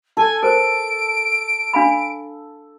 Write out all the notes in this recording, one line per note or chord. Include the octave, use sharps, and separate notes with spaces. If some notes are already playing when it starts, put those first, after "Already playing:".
A4 G#5
A#4 C5 D7
D4 F5 B5